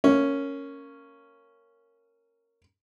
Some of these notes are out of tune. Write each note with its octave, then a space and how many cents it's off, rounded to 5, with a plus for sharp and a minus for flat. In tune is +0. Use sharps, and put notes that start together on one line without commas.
A#3 -10 C#4 +0